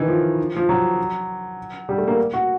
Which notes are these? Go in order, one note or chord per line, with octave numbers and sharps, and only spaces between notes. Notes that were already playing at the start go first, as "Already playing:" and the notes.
Already playing: D#3 E3
F3
F3
F#3
G3
A3
A#3
F#4